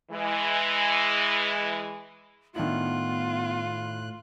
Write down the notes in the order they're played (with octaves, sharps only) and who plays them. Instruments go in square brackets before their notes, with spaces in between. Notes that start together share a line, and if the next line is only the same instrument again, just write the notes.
[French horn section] E3 G#3
[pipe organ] A2 F#6 [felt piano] D#3 D4 E4 [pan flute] B3 [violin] F4